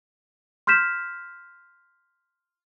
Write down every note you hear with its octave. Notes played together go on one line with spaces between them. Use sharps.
C6 F6 G6 B6 E7